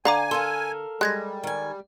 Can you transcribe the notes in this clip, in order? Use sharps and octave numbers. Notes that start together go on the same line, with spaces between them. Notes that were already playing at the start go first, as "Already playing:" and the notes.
D3 F5 G#5 A#5 D6
A4 A#4 F5 C6
G3 G#3 F#6 G#6 A#6
D#3 G#5